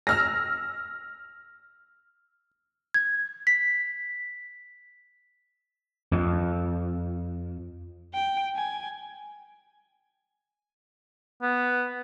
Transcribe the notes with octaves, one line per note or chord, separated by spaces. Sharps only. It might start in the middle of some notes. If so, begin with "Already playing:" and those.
E6 F6 A#6
G#6
B6
F2
G5
G#5
B3